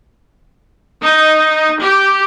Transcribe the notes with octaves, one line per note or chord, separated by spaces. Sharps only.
D#4
G4